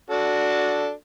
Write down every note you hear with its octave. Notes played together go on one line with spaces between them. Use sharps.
D4 F#4 A4